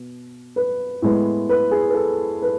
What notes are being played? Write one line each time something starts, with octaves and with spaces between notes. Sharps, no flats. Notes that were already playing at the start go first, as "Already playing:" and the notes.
Already playing: B2
B4
A2 G#3 B3
B4
G#4
B4
A4
B4